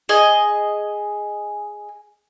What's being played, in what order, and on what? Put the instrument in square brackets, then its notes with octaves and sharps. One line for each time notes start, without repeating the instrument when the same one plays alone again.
[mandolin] G#4 D#5